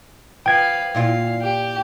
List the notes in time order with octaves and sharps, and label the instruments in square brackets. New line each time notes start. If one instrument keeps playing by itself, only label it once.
[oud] F3 [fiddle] B4 F5 [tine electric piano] G5 G#6
[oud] A#2 E4 F4 [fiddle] F5
[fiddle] G4